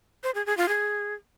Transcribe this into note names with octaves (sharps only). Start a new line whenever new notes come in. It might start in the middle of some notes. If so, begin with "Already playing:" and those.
C5
G#4
G#4
F4
G#4